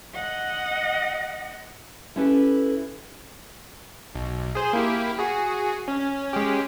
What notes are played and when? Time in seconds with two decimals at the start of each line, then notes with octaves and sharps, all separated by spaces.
0.15 D#5 F#5
2.16 C#4 E4 G4 A4 B4
4.15 B1
4.55 G#4 C5
4.73 A#3 E4 G4
5.19 F#4 G#4
5.88 C#4
6.33 G#3 C#4 G4